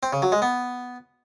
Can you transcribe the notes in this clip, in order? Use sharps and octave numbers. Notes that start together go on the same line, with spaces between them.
C4
C#3
F#3
G#3
B3